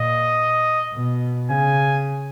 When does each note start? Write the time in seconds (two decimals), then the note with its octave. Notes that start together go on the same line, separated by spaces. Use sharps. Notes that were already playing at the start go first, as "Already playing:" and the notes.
Already playing: A#2 D#5
0.94 B2
1.50 C#3 G#5